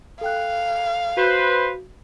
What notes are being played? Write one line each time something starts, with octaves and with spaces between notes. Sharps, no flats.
A4 F5 G5 F#6
F#4 B4 C5